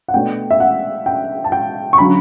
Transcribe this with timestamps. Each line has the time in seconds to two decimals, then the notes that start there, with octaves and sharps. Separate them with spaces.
0.08 F#5
0.14 B2 A3 D4 G5
0.50 E5
0.60 F#5
1.06 G5
1.44 A5
1.52 G5
1.93 C#6
1.98 D3 F#3 C#4 B5